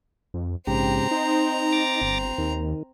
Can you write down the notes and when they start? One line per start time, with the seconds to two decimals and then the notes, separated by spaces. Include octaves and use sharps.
0.34 F2
0.67 A#1 G#2 C#3 C4 G4 A#5
1.11 D#4 C5
1.72 D6 A6 A#6
2.02 G1
2.38 D#2 D#3